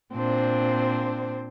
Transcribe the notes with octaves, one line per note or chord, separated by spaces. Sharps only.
A#2 C4 D4 C5